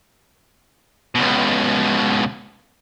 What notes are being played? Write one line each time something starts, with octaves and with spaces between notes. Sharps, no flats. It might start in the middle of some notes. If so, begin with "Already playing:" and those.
C#2 B2